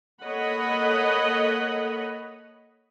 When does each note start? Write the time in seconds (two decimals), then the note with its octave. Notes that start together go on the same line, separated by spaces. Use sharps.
0.24 A#3 A4 C#5 D#5 F#5 B5